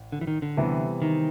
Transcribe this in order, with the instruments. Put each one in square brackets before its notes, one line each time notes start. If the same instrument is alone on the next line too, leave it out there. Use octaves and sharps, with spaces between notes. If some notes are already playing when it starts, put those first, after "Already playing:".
Already playing: [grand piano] A1
[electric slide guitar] D3
E3
D#3
D3
[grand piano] C3 E3 G3 B3
[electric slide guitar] D#3